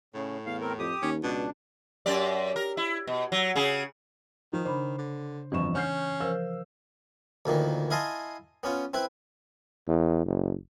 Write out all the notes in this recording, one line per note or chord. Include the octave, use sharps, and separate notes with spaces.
A2 C#3
E2 F5
C4 A#4
F2 G4 D#6
D#2 C#4
C#2 B2 D4
F#2 G4 D5
A#4
E4
B2
F#3
C#3 G#4
D#3 F3
C#3 D4 C5 B5
D3
G1 F2 B2 E3 C#6 E7
C#4 F6 G6 C7
F3 A#4 C5 E6
D2 A#2 D#3 E3
E4 D#5 F5 G#5 A5 C6
B3 C#4 F4
C4 E4 B4
E2
F#1